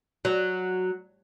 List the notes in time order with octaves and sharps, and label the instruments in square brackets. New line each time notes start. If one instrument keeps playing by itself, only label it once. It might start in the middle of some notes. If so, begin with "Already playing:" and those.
[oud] F#3